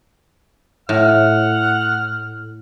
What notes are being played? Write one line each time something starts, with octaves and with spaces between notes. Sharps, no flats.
A2 F#5 F6